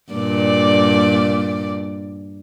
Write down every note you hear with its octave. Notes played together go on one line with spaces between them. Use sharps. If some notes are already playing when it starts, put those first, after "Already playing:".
G2 A#2 D5